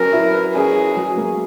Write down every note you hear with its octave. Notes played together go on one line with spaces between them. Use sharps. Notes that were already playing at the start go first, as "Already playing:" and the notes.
Already playing: F#3 C#4 A#4 B4
E4
B4
C#4 G#4
E4
F#3
A#3